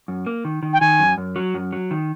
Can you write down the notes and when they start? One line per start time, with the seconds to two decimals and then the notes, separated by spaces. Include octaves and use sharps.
0.08 F#2
0.26 A#3
0.45 D#3
0.63 D#3
0.73 G5
0.80 D#3 G#5
1.00 F#2
1.18 F#2
1.36 F#3
1.54 F#2
1.73 F#3
1.91 D#3